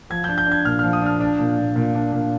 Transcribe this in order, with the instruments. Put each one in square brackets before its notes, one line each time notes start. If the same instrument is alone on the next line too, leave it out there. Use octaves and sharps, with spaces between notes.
[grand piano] F3 G#6
G6
D4
G6
D4
G#6
A#2 F6
F3 F6
D#6
D4 F6
D4
A#2
A#2
A#2
D4
A#2